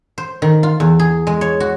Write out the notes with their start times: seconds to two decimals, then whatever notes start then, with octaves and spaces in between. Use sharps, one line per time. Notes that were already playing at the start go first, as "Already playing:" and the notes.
0.18 C5
0.42 D#3
0.63 F4
0.80 E2
0.99 G#4
1.27 G#3
1.41 C#5
1.60 F#4